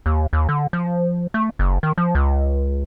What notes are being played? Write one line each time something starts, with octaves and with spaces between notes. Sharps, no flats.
D#2
D#2
D3
F3
A3
F#1
D#3
F3
C#2